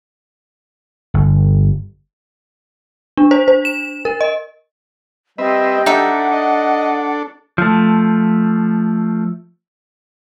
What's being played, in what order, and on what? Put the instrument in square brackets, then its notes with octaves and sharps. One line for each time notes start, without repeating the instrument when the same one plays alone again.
[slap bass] G1
[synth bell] D4
C5
C5
E7
A#4
D#5
[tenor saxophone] G3 [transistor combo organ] C4 B4 E5 [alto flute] D#5
[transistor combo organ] D4 A4 [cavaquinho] D#4 E5 [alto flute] F#5
[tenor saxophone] D#5
[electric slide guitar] F3 A3